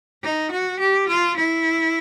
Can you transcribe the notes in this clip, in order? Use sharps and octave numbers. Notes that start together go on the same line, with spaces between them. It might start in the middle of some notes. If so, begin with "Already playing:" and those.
D#4
F#4
G4
F4
E4